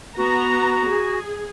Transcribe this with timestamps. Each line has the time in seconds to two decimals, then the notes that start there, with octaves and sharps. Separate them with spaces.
0.17 B3 F#4 A#5
0.89 G#4